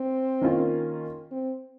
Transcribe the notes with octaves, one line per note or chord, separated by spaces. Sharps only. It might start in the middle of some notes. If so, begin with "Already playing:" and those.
Already playing: C4
D#3 A#3 C#4 F4
C4